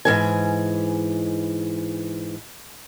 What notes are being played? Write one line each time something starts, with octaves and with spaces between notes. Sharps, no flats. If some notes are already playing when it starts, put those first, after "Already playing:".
G#2 E3 G#5